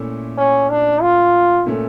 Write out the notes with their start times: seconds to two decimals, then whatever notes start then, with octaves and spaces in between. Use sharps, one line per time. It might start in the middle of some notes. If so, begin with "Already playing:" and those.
Already playing: A#2 A3 C#4 E4
0.38 C#4
0.70 D4
1.02 F4
1.67 A#2 A3 C#4